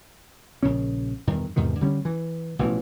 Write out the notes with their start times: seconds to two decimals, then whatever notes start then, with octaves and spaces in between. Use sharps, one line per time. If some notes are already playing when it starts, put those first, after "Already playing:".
0.63 A#1 C#3 C#4
1.27 E1 G2 D#3
1.56 E2 G#2 C3 D#3
1.81 D3 G3 C#4
2.05 E3
2.59 A1 B2 E3 F3